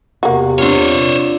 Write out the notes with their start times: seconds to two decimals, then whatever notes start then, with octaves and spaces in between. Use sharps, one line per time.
0.23 E2 C3 A#3 F#4
0.58 C4 D4 F4 C5 C#5